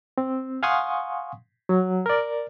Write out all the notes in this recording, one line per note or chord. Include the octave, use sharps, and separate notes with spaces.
C4
F5 F#5 G#5 C6 C#6 D#6
F#3
A#4 D5